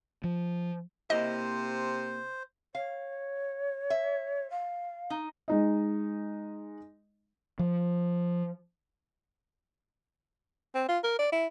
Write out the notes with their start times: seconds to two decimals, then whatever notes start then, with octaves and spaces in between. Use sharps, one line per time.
0.24 F3
1.10 C3 A#3 E4 C5 D#5
2.75 C#5 F5
3.90 E5
4.50 F5
5.10 D#4
5.48 G#3 D#4 D#5
7.59 F3
10.74 C4
10.88 F4
11.04 A#4
11.19 D5
11.32 E4